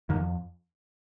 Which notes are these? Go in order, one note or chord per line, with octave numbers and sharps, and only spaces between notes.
F2 D#3